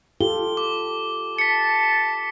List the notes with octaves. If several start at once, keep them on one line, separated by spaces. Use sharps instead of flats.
F4 G4 A4 G7
D6
A5 B6 C#7